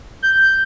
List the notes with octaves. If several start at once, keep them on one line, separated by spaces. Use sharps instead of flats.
G6